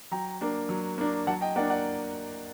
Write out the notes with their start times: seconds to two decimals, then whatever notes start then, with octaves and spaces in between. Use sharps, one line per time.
0.11 F#3 G5 A#5
0.41 A#3 D4
0.69 F#3
0.98 A#3 D4
1.27 F#3 F#5 A5
1.41 D#5 G5
1.56 A#3 D5 F#5
1.59 D4
1.70 D5 F#5